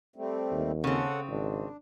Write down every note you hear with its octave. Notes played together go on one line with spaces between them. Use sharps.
G3 A3 C4
D#2
C#3 C4 C#4 A4 F#5
G#1 D4